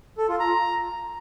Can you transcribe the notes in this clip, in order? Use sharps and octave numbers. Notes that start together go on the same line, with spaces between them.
A4
F4
A#5